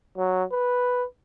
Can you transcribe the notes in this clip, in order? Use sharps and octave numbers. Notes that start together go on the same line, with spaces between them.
F#3
B4